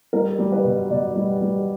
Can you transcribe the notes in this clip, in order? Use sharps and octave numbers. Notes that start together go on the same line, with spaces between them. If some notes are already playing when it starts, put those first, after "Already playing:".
G3 A#4
G3
B4
B2
B2 D5
G3
G3